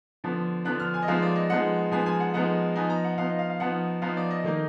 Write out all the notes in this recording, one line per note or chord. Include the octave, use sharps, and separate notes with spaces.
D3 F3 B3 D4
D3 F3 B3 D4 F#6
F6
G#5
D#5
F3 G#3 B3 D#4 F5
D5
D#5
F3 G#3 B3 D#4 F#5
F3 G#3 B3 D#4 G#5
G#5
F#5
F3 G#3 B3 D#4 F#5
F3 B3 D#4 G#5
A#5
F#5
F3 B3 D#4 F5
D#5
F5
F5
F3 B3 D#4 F#5
F3 B3 D#4 F5
D5
D#5
D#3 A#3 D#4 D#5